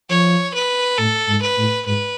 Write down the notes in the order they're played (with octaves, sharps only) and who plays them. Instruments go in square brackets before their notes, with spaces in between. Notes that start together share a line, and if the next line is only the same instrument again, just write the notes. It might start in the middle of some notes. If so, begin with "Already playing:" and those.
[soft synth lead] F3 [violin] C#5
[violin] B4
[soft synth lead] A2 [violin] A4
[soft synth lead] G#2
[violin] B4
[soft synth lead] A2
[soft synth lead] G#2 [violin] B4